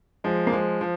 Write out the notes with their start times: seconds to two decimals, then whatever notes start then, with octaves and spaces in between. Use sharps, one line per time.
0.24 F3 G#3
0.47 A#3
0.52 F3 G#3
0.81 F3